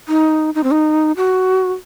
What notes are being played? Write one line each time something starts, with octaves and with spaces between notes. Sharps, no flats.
D#4
D#4
C4
D#4
F#4